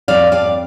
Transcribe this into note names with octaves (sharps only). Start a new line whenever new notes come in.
F2 D5 F5
F2 D5 F5